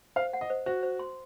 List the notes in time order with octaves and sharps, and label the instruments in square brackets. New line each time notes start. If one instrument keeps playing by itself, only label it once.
[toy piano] C5 [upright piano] F5
[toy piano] F#5
[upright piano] D#5
[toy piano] C5
[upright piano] F#4 [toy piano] C5
[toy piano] C5
C6